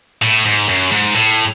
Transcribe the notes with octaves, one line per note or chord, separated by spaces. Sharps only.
A2
G#2
F#2
G#2
A2